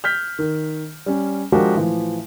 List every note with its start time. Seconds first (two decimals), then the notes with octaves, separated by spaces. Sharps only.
0.04 F6 G6 B6
0.39 D#3
1.06 G3 C#4
1.52 F3 G#3 D4 F#4 G4 A#4
1.75 A2 E3 F3